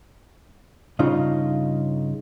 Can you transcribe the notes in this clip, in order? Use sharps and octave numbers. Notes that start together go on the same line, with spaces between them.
G2 C#3 D#4 F4